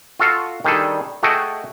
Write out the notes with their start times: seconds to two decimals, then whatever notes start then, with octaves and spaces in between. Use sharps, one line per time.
0.19 F4 F#4 A4 F5
0.64 D#3 G3 D4 G#4 A4
1.23 A3 F#4 G#4 A4 D#5 G5